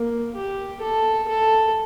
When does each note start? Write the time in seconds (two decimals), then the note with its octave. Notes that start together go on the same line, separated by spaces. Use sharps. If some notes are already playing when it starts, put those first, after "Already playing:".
Already playing: A#3
0.35 G4
0.81 A4
1.28 A4